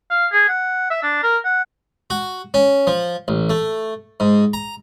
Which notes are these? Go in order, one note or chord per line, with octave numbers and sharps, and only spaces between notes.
F5
G#4
F#5
E5
D4
A#4
F#5
F#4
C#4
F3
A1
A3
G#2
A#5